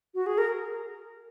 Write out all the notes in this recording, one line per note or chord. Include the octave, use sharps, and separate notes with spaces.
F#4
G#4
A#4